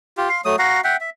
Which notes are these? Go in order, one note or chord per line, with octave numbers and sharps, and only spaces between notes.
F4 G4
F5 C6
F#3 A3 D#6
F#4 F5 F#5 A#5
E5 F#5 G5
E5